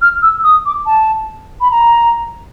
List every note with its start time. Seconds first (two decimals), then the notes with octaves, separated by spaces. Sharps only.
0.02 F6
0.22 E6
0.44 D#6
0.66 D6
0.86 A5
1.61 B5
1.71 A#5